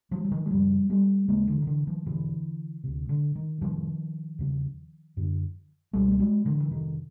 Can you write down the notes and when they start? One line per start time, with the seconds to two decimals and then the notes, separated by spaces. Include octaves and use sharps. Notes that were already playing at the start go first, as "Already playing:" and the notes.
0.11 E3 F#3
0.25 F#3
0.32 D#3 F3
0.46 G#3
0.50 F#2 C#3 F3 G3
0.90 G3 A3
1.28 D#2 C#3 G#3 A#3
1.47 D3 E3
1.61 D#3
1.67 D3 E3
1.87 D#3 F3
2.06 E2 B2 D3 E3
2.84 D2 C3
3.09 D3
3.35 D#3
3.61 F2 C3 D#3 F3
4.39 E2 C#3
5.17 F#2 D3
5.93 C#2 B2 G3 A3
6.11 A3
6.20 F#3 G#3
6.45 D3 E3
6.60 E3
6.71 F2 C3 D#3